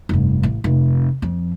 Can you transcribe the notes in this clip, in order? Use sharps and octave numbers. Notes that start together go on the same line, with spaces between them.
F1 G2
A1
F1
F2